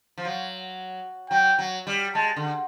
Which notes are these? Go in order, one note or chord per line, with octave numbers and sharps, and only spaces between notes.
F3
F#3
F#3 G5
F#3
G3
G#3 A5
D3